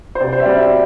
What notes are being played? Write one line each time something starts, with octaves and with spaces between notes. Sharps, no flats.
C5
C3 D5
C5
E5
G3 C4 D5
E5